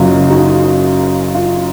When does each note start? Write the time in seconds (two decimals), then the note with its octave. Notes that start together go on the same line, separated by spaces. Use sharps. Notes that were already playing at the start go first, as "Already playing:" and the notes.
Already playing: F#1 F#2 C#3 F#3 F4
0.30 D#4 F#4
1.35 F4